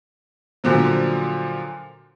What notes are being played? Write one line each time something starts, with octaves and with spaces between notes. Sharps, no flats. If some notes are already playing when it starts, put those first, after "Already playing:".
A#2 D3 F3 F#3